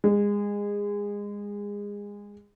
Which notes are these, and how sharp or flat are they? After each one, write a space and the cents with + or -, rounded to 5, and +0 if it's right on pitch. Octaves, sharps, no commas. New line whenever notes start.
G#3 -25